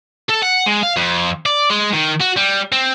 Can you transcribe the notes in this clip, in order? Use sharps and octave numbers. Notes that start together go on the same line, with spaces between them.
A4
F#5
G#3
F5
F2
D5
G#3
D#3
F#4
G3
C4